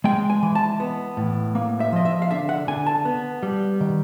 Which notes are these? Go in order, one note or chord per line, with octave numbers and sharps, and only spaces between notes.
G#3 G5
G#5
E3
A5
B3
A2
A#3
E5
F3 D#5
E5
F5
D3 E5
F#5
D3 G#5
A5
B3
G3
D#3